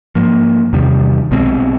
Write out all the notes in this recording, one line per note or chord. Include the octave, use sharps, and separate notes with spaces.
G#2 F3 A#3
E2 C3 D#3 G3
B1 B2 G#3 C4